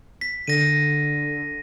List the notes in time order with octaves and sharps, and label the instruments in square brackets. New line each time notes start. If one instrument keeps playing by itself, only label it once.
[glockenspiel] B6
[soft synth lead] D3 [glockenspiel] A#6 D#7